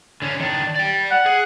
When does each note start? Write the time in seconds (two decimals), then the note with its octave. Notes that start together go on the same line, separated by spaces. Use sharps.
0.22 D3 C#4
0.40 D#3 D4
0.75 D5 G5
1.11 F#5
1.26 G#4